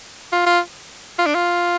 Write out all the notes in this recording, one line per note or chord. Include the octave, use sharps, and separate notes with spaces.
F4
F4
F4
D4
F4